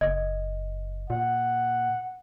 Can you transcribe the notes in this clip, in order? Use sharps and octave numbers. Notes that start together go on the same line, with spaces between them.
F#1 D#5
A#2 F#5